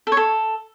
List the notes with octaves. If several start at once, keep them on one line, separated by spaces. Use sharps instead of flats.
A4
C#5
A4